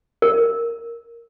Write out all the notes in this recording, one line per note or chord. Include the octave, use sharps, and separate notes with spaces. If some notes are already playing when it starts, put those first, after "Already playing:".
A#4